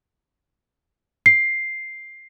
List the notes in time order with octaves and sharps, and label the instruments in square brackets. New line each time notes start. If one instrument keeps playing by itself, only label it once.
[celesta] C7